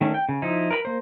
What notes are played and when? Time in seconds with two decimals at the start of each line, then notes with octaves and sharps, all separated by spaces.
0.01 D#3 A3 C#4 D4
0.14 G5
0.29 C#3
0.42 F3 D#4 E4
0.71 A#4 B4 D5 B5
0.85 A#3 C5